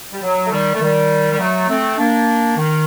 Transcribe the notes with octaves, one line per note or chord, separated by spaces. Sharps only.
G3
F#3
A3
D#3 G3
A3
D#3 G3
G3
F#3 A3
A3 C4
A#3 D4
D#3